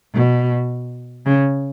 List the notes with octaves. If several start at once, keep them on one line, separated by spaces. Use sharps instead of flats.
B2
C#3